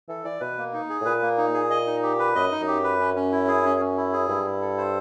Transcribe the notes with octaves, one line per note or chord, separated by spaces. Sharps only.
E3 A4
E3 D5
B2 B4
A#3
D#4
G#4
A2
A#2 B4
A#3
D#4
G#4
D#5
D#4
G4
B4
F#2 D#5
D#4
F#2
G4
B4
C#4
C#4
E4
G#4
C#4
C#4
E4
G#4
G2 E4
E4
A4
C5